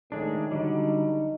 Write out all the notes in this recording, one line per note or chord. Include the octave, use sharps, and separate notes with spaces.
A2 D#3 G#3 D4
D3 F#3 G3 D#4